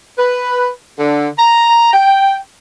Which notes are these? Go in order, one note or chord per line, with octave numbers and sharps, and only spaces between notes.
B4
D3
A#5
G5